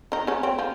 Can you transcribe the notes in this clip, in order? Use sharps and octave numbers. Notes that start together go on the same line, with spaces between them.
D#3 D#4
C#3 C#4
C4
F3 F4